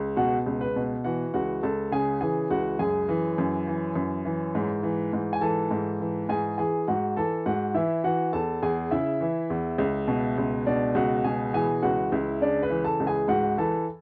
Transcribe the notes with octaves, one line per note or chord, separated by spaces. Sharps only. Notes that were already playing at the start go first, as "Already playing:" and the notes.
Already playing: C#2
B2 F#4 F#5
C#2
B4
B2
E3 F#4 F#5
C#2 F#4 F#5
C#2 A4 A5
C#3 G#4 G#5
E3 G#4 G#5
C#2 F#4 F#5
F#2 G#4 G#5
E3
F#2
E3
F#2
E3
G#2
E3
G#2
G#5
E3 A4 A5
G#2
E3
G#2 G#4 G#5
E3 G#4 G#5
G#2 F#4 F#5
E3 A4 A5
G#2 F#4 F#5
E3 E4 E5
E3 F#4 F#5
E2 A4 A5
E2 G#4 G#5
C#3 E4 E5
E3
E2
C#2
B2
C#2
B2 D4 D5
C#2 F#4 F#5
B2 G#4 G#5
E3 G#4 G#5
C#2 F#4 F#5
C#2 E4 E5
C#3 D4 D5
B4
E3
A4 A5
C#2
G#4 G#5
G#2 F#4 F#5
E3 A4 A5